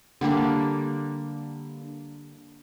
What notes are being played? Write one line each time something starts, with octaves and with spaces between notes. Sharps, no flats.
D3 G3 A#3 D4